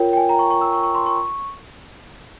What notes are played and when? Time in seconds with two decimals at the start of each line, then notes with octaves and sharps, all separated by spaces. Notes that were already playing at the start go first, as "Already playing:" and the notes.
Already playing: F4 A#4 C#5 G5
0.13 G5
0.17 G#5
0.29 A#5
0.39 C#6
0.50 C#6
0.61 E6
0.73 C#6
0.83 C#6
0.95 C6
1.06 C#6